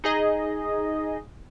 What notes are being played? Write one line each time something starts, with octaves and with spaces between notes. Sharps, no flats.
D#4 G#4 D#5